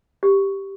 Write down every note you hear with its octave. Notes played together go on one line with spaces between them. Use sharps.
G4